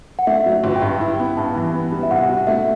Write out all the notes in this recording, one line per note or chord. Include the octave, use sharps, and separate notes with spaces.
F#5
A3 E5
F#3
E5
G1
G5
G2
E4
B3
G2 A5
E3
B3
G3
E5
C2 F#5
B2
A3 E5